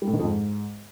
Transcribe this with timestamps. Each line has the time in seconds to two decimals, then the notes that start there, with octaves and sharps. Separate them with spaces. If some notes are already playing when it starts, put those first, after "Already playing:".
0.02 G3
0.08 A2
0.13 D#3
0.19 F2
0.25 G#2